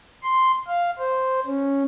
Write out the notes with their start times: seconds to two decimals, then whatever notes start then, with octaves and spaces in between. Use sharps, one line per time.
0.22 C6
0.67 F5
0.98 C5
1.46 C#4